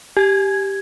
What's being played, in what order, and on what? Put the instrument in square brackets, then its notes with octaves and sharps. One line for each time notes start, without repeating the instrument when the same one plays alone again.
[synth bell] G4 G#6